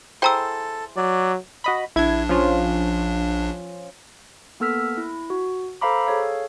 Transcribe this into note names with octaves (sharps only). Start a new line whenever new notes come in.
E4 G#4 A4 C5 G5 A#5 E6
F#3 D5
F#4 D#5 B5
A#1 D4 E4 G#6
F3 C#4 F4
A#3 B3 A4 E6 F6 B6
E4
F#4
A4 C5 F5 A#5 B5 D6
G#4 A4 C#5 F5